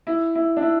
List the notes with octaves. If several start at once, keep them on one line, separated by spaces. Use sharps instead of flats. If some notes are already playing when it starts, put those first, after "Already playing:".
E4
E4
D4
E4